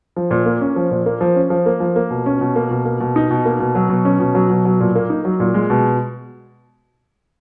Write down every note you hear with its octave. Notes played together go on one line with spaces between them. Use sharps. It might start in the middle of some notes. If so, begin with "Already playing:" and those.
F3
A#2
A#3
C#4
F3
A#2
A#3
F3
C#4
F3
A#3
F3
A#3
B2
C#4
B2
A#3
B2
A#3
B2
D#4
B2
A#3
B2
F#3
B2
C#4
B2
F#3
B2
F#3
A#2
A#3
D#4
F#3
A#2
G#3
B2